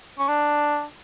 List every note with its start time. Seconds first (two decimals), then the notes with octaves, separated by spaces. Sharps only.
0.19 C#4
0.28 D4